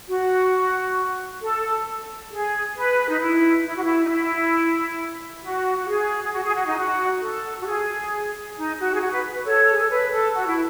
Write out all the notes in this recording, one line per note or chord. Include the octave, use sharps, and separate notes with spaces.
F#4
A4
G#4
B4
D#4
E4
E4
F#4
E4
D#4
E4
F#4
F#4
G#4
G#4
F#4
G#4
F#4
D#4
F#4
A4
F#4
G#4
D#4
F#4
G#4
F#4
B4
B4
A4 C#5
G#4
A4
B4
A4
F#4
E4